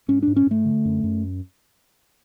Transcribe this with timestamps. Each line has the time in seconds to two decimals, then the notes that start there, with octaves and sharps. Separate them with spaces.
0.08 G#2 C#4
0.22 G#2 D4
0.36 C#4
0.47 G#2 A3
0.65 D3
0.85 F#2
1.03 F#2